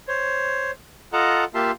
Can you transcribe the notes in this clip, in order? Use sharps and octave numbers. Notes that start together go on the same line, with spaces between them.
C5 C#5
F4 A4 D#5 F#5 A5 A#5
A#3 F4 G4 E5 A5 C6